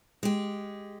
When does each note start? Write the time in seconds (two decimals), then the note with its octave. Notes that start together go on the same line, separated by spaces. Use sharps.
0.23 G#3 G4